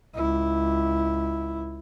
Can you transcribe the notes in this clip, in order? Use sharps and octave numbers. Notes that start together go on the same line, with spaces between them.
C#2 E4